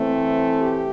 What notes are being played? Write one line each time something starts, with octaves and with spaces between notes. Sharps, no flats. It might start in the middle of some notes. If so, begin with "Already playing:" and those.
Already playing: E3 A3 C4
G4